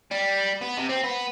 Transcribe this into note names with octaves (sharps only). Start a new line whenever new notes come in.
G3
B3
C3
C4
B3